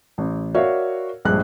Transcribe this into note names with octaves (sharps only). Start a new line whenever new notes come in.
A1
F#4 A#4 C#5 D5 E5 F5
A#1 G2 G#3 F#6